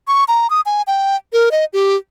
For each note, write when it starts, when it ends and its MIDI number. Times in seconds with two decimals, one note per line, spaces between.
0.08 0.24 85
0.28 0.50 82
0.50 0.61 87
0.66 0.82 80
0.87 1.16 79
1.33 1.49 70
1.51 1.65 75
1.73 1.96 67